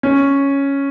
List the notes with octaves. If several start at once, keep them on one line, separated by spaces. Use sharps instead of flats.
C#4